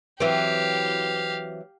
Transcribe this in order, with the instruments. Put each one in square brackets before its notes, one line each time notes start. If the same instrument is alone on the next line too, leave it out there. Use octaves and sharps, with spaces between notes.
[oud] E3 F#3 C4 [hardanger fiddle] G4 F5